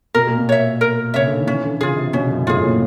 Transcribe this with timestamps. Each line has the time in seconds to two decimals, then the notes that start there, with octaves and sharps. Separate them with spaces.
0.14 B2 A#4
0.27 A#2
0.38 B2
0.49 C#5 E5
0.81 A#4
1.14 C#3 C#5 E5
1.26 D3
1.37 D#3
1.47 E3 C#4
1.63 D3
1.75 D3
1.81 C#3 F4 G#4
1.97 C3
2.13 B2 C#4
2.31 F#2
2.46 A2 F4 G#4
2.58 A2
2.63 A#2